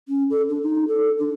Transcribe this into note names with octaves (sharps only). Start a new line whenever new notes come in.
C#4
A4
D4
D#4
A4
D4